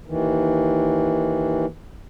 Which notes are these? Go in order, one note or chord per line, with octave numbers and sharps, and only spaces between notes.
D#2 D#3 E3